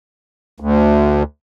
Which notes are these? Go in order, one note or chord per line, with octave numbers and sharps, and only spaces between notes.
D2